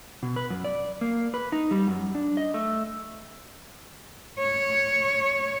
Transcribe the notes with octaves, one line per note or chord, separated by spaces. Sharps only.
B2
B4
F#2
D5
A#3
B4
D#4
G3
F#2
D4
D#5
A3
C#5